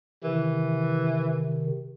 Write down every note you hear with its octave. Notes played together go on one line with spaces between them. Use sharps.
C3 D#3 E3